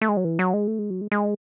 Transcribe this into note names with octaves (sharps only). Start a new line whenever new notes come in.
A3
G#3
F#3
E3
F#3
G#3
A3
G#3
F#3
G#3
G#3